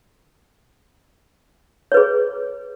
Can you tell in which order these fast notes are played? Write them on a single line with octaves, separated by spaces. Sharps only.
C#5 B4 G#4